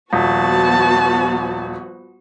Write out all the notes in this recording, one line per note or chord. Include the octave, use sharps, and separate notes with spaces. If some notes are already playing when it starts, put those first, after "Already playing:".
D#1 F3 B3 F#4 A5